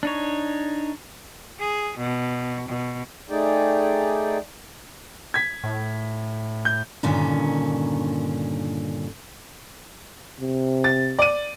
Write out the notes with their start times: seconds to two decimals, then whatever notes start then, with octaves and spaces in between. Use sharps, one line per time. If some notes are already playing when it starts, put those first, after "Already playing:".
0.03 D4 D#4 C#5
1.59 G#4
1.98 B2
2.69 B2
3.30 A3 D#4 G#4 D5 G5
5.34 G#6 B6
5.64 A2
6.65 G6
7.03 G2 A#2 D3 D#3 C#4
10.41 C3
10.84 A6
11.19 D5 D#7